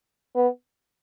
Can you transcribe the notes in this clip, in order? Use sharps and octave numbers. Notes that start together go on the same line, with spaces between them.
B3